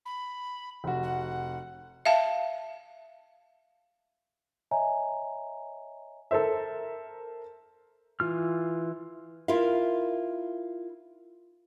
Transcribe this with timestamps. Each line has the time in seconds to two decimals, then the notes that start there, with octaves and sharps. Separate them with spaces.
0.06 B5
0.84 F1 F#4
1.03 F#5
2.05 E5 F5 A5
4.71 C#5 D#5 E5 G#5 A#5
6.31 A4 A#4 C5 E5
8.20 E3 F4 F6
9.48 E4 F4 A#4 E5 F5